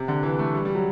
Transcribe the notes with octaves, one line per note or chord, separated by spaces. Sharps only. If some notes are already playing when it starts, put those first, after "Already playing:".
Already playing: C3
D3
E3
A3
G3
G3
F#3